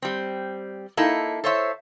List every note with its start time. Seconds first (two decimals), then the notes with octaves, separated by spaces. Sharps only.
0.02 G3 C4
0.97 A#3 D#4 E4 A4
1.44 A4 C5 C#5 E5